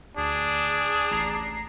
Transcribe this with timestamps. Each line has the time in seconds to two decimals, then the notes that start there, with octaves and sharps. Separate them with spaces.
0.17 D2 D4 G#4
1.11 A1 A#5 C7